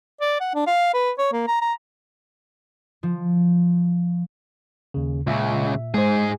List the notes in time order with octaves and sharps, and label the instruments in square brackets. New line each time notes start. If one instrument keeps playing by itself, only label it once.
[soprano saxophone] D5
F#5
D4
F5
B4
C#5
A#3
A#5
A#5
[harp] F3
[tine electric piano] D#2 C#3
[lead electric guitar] C#2 C#3 [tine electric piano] A#2 E5
[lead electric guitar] G#2 G#4 [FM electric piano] G#3 C5